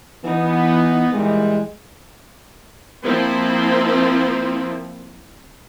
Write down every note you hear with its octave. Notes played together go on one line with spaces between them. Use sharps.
E3 B3 D#4
A#2 E3 G3 G#3
F3 A#3 C4 E4